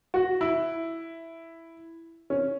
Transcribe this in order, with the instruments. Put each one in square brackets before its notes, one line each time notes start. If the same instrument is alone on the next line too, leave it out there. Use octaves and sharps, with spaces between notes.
[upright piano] F#4
E4
C#4